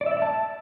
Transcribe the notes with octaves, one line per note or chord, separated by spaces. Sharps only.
D5
E5
D5
E5
A5